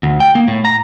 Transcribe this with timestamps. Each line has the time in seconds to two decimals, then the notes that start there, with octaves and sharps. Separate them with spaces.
0.03 D2
0.20 G5
0.35 A#3
0.48 A2
0.65 A#5